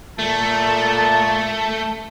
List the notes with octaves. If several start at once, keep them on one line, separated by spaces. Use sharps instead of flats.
A#2 A3 A5